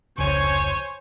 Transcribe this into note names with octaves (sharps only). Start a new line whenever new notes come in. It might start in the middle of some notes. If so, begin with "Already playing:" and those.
F1 C#2 C5 C#5 G#5